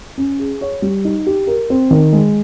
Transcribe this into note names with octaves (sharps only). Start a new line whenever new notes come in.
C#4
G#4
C#5
G3
D#4
G4
A#4
C4
D#3
G#3